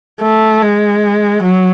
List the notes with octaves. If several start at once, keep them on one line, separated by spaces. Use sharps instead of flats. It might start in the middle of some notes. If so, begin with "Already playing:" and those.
A3
G#3
F#3